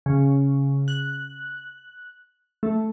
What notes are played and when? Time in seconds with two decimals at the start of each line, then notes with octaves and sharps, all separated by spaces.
0.06 C#3
0.88 F#6
2.63 A3